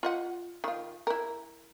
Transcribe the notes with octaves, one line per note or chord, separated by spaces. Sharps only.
F4 D#5 F#5
D#3 F4
E4 A#4